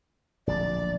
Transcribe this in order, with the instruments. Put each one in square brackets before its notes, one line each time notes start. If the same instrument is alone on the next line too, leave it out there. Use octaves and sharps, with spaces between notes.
[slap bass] D1 A#1 [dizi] D5